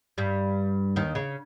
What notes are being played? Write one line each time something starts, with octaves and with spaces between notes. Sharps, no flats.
G2 G3
D#2 D#3
C#3